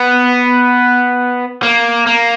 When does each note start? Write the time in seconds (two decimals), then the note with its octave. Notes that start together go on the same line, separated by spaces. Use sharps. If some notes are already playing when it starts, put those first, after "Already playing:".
Already playing: B3
1.63 A#3
2.07 A#3